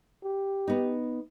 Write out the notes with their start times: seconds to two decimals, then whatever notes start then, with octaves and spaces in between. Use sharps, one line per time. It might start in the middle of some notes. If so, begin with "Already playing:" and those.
0.24 G4
0.68 B3 D#4